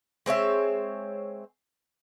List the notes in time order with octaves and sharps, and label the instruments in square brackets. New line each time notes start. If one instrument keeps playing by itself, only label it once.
[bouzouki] G#3 C4 C#5 E5